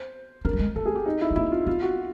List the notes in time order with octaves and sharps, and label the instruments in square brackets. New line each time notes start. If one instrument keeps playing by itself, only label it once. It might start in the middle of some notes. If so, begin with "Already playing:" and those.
Already playing: [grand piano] C5
[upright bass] D4 [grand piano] A#4
[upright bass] G3
G#3
[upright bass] A3 [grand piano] A4
[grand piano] G#4
G4
D#4
E4
[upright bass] A3
[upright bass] A#3 [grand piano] E4
[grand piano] F4
[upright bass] B3 [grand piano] F4
[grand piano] F#4